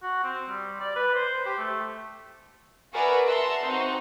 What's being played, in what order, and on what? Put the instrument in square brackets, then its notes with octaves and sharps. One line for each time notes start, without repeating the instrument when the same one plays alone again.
[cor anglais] F#4
C4
G3
D5
B4
C5
G4
A3
[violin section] F#4 G#4 A#4 B4 D5 E5
E5 F#5 A5 A#5 C6
C4 D#4 F#4